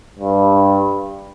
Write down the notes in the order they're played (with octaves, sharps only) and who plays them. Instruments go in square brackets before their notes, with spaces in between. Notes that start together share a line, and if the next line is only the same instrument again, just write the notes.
[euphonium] G2